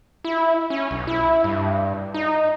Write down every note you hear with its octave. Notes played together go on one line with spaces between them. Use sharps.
E4
C#4
B1
E4
G2
D#4